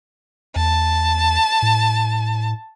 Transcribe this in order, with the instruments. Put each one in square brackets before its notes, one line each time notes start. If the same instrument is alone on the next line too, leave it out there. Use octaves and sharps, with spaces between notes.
[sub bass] E2 [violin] A5
[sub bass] A2